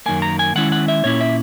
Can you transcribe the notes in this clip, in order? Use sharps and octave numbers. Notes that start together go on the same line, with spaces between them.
F#2 D#3 A#3 G#5
A#5
G#5
D#3 G#3 C#4 E4 F#5
F#5
E5
A#2 A#3 C#4 E4 C#5
E5